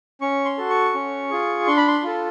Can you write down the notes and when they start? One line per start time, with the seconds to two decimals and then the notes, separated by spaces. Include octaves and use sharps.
0.21 C#4 C#6
0.45 C6
0.58 F#4 A4
0.70 C#6
0.94 C#4
1.30 F4 G#4
1.67 D4 C6
1.77 B5
1.88 C6
2.03 F4 A4